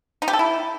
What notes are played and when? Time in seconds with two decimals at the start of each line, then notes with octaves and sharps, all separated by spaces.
0.22 D#4
0.28 G4
0.33 A4
0.39 E4